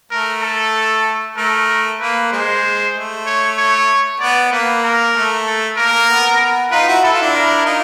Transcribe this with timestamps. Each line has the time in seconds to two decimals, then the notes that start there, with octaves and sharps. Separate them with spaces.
0.11 A3 A#4
0.42 A4
1.37 A3 A#4
1.99 A#3 B4
2.32 G#3 C5
2.94 A3
3.26 C#5
3.58 C#5
4.20 B3 D5
4.52 A#3 B4
4.84 A#4
5.14 A3
5.47 A4
5.77 A#3 A#4
5.93 A#3
6.09 B3
6.72 D#4 F4 B4
6.87 E4 F#4
7.03 E4 A4
7.13 F4
7.21 D4 E4
7.35 A#4
7.66 D#4 F4